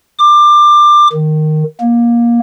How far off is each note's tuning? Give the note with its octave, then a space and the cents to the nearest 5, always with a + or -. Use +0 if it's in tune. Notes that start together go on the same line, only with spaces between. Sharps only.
D6 +20
D#3 -10
A#3 +20